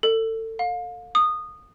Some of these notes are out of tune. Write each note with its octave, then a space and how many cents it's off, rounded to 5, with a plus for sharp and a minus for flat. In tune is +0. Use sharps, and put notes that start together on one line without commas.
A4 +30
F5 +30
D#6 -15